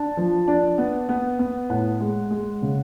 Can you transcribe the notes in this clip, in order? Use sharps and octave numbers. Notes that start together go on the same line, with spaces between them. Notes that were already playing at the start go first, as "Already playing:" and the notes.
Already playing: D4 A5
F3
D4
B3
B3
B3
A2 F#5
G#3
G#3
C#3